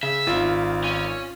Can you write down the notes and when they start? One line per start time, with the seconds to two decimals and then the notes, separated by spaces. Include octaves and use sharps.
0.03 C#3 E5
0.27 G#1 D#3 F4
0.84 C#4